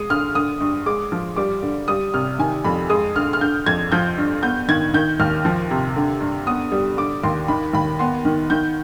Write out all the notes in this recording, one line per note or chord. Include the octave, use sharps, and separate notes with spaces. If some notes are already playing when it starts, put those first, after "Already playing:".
Already playing: G#3 D#6
D3 F6
D3 D#6
G2
G#3 D6
F3
G3 D6
D3
G3 D#6
C3 F6
D#3 G#5
F2 B5
G#3 D#6
D3 F6
F6
D3 G6
F2 G#6
F3 G6
G2
B3 G6
D#3 G#6
D#3 G6
D#2 F6
F3
C3
D3
G2
B3 D#6
G3
D3 D6
D#2 C6
D#3 B5
D#2 B5
B3 C6
D#3
D#3 G6